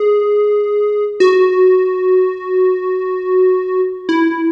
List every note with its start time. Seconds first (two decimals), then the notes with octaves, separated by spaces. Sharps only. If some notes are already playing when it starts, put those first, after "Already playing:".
Already playing: G#4
1.20 F#4
4.09 E4